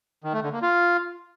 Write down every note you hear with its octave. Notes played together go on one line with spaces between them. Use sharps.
D#3
A3
D3
A#3
F4